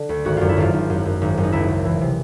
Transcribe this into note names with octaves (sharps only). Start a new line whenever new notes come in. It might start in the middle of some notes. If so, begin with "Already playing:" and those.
Already playing: D3
D2
G#1 F#4
F#2 F4
E4
G#1 F4
G#1
F#2
F#2
G#1
F#2
D#4
C#2 E4
C#2
E3
C3